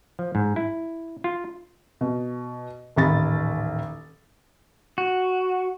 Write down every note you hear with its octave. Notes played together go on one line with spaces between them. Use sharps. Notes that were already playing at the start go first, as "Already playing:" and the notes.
F3
G#2
E4
F4
B2
D#1 A1 D#3 B5 A6
F#4